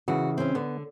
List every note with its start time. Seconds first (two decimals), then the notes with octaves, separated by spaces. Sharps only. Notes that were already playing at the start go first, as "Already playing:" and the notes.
0.08 C#3 E3 F#4
0.38 C4 C#4
0.55 D3 B3